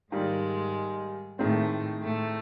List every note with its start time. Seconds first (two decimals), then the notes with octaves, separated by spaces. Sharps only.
0.12 G#2 D#3 G3 G#3 A#3
1.39 A2 D#3 G#3 A3 C4
2.02 A2 A3